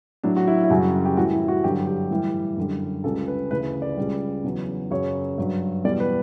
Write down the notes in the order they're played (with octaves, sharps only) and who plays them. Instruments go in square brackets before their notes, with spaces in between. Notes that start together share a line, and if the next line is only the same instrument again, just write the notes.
[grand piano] A2 F#3 D4
F#4
E4
E4
F#2 C#3 G3 F#4
G4
A2 E3 G3 F#4
E4
F#4
G2 D3 F#3 G4
G4
A2 E3 G3
F#2 D3 G3
C#2 C#3 G3 A4
B4
D2 C#3 E3 B4
D5
C#2 C#3 G3
E2 C#3 F#3
F#2 C#3 F#3 C#5
G2 F#3
E2 B2 G3 D5
B4